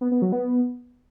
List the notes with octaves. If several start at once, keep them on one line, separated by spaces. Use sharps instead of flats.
B3
B3
F#3
B3